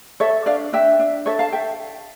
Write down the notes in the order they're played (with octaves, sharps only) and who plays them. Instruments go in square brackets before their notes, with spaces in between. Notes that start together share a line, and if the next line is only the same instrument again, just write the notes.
[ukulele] A4 C#5 E5
D4 D5 F5
D4 E5 G5
D4
A4 C#5 E5
F5 A5
A4 E5 G5